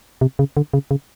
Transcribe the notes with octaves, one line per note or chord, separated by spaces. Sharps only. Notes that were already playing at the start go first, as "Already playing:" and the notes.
C3
C#3
D3
C#3
C#3